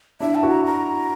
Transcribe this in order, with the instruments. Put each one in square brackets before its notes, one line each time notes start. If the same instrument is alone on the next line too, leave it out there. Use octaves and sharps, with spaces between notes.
[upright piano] D4 E4 [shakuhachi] E5
[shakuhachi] A5
[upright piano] E4 F#4
[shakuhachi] A#5
A#5